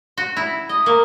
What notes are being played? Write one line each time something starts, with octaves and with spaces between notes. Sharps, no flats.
F#4
E4
D#5
A#3